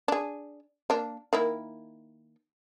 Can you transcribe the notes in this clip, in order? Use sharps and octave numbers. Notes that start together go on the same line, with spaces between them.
D4 G#4
A#3 D4
D#3 A#3 E4